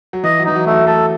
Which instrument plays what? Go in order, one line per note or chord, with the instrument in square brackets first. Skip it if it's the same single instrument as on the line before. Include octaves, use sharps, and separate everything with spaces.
[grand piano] F#3
[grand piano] E3 [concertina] D#5
[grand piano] F#3
[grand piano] E3 [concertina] D#4
[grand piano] F#3
[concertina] A3
[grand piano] F#3
[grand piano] A3 [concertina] A4